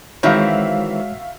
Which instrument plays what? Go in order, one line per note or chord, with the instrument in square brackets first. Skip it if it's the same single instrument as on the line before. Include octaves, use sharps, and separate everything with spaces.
[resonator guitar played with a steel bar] D#3 E3 C4 [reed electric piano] G#3 C#5 [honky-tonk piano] F#4 E5 F5